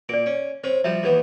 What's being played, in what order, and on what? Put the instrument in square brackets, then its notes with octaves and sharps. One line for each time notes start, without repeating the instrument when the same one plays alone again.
[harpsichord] A#2 [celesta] D5 D7
[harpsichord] C#4
[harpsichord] C4 C#4 [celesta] C5
[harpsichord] F3 G3 [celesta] E5
[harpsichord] D#2 E3 B3